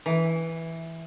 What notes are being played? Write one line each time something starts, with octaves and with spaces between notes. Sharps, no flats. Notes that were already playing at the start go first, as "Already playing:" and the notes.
E3